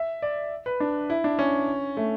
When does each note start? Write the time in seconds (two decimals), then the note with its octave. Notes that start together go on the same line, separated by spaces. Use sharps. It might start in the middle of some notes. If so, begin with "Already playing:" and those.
Already playing: E5
0.22 D5
0.66 B4
0.80 D4
1.10 E4
1.24 D4
1.39 C#4
1.97 A3